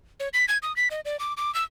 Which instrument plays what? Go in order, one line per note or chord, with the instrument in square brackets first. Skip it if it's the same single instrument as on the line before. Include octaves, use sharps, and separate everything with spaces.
[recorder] C#5
B6
G#6
D#6
B6
D#5
D5
D6
D6
E6